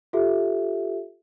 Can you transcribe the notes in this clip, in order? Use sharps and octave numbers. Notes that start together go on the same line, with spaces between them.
F4 G4 A4 E5